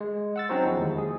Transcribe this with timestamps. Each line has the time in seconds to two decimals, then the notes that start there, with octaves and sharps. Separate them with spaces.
0.01 G#3
0.36 F#5 E6 A6
0.49 F#3 C4 C#4 D#4 F#4 C5
0.65 E2 F3 E4
0.80 D#2 G#3
0.98 G#4